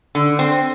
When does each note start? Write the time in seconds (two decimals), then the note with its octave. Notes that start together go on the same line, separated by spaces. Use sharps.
0.15 D3
0.39 C4